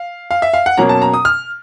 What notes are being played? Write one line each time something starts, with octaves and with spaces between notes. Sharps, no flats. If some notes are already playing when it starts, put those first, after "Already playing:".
Already playing: F5
F5
E5
F5
F#5
B2 F#3 A#3 C#4 A#5
A5
A#5
D#6
F6